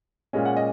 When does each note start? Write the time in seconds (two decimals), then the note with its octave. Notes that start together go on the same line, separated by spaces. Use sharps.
0.33 A#2 G#3 C#4 D#5
0.45 F#5
0.57 D#5